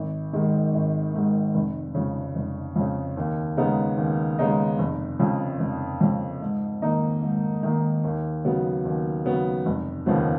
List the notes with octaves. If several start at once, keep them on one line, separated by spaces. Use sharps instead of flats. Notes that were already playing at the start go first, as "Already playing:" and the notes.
Already playing: G#1
G#2 D#3 G#3
G#1
G#2 D#3 G#3
F1
F2 C#3
F1
F2 C#3
D#2
C#3 G#3 B3 D#4
D#2
C#3 G#3 B3 D#4
F1
F2 C#3
F1
F2 C#3
G#2
D#3 A#3 D#4
G#2
D#3 A#3 D#4
D#2
C#3 F#3 B3
D#2
C#3 F#3 B3
F1
D#2 C#3 F3 B3